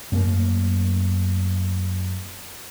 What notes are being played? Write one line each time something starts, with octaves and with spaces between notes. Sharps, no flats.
F#2 A3 A#3